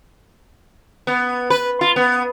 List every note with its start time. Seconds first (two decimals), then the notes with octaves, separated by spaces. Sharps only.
1.07 B3
1.50 B4
1.81 F4
1.96 B3